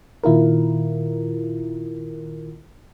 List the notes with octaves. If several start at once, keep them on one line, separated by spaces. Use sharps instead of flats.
A#2 D#3 E4 F4 A#4